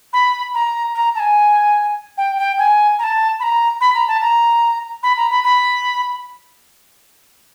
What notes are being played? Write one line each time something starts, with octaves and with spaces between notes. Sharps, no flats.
B5
A#5
A#5
A5
G#5
G5
G5
G#5
A#5
A5
B5
A#5
B5
A#5
A5
A#5
B5
A#5
B5
B5